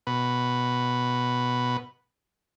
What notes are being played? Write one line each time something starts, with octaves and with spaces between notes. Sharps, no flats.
B2 B4